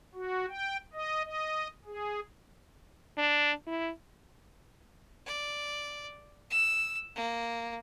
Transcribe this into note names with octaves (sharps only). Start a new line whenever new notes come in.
F#4
G5
D#5
D#5
G#4
D4
E4
D5
E6
A#3